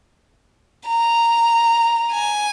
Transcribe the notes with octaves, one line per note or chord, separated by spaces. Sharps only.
A#5
G#5